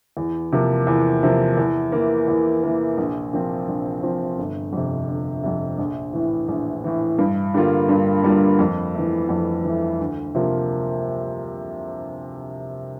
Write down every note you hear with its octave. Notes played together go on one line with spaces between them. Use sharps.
E2
C3 F3 A#3
E2
C3 F3 A#3
E2
E3 A#3
E2
E3 A#3
A#1
A#2 F3 C4
A#1
A#2 F3 C4
G1
F2 C3
G1
F2 C3
A#1
A2 E3
A#1
A2 E3
G2
D3 G3 A#3 F4
G2
D3 G3 A#3 F4
F2
E3 A3
F2
E3
A3
D2
C3 F3 A#3 F4